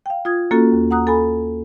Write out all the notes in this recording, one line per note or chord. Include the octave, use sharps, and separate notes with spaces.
F5 G5
F4 D#6 G#6
A#3 C#4 F4 F#4 A4
D#2
F#5 A#5 D#6 F#6
A4 G#5 B5